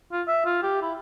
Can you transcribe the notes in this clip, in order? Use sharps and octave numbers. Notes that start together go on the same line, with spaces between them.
F4
E5
F4
G4
E4